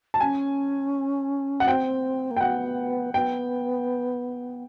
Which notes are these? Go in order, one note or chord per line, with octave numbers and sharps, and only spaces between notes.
A5
C#4 G#5
F#5
C4 G5
A#3
G5
B3 F#5
B3 G5